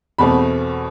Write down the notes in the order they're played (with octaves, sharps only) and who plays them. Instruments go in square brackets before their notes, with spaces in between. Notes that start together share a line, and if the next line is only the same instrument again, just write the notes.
[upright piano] E2 B2 A3 C4 B5